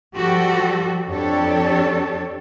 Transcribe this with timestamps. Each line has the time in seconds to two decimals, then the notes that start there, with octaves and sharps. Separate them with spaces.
0.14 F3 G3 F#4 G4 A4
1.08 F2 D4 G4 A4 C#5